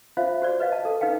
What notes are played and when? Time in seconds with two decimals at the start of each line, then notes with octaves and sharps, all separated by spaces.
0.17 F4 C5 E5 F5
0.42 F#4 C5 D5
0.60 B4 D#5 F5
0.72 A5
0.85 A4
1.01 D#4 B4 F5 G5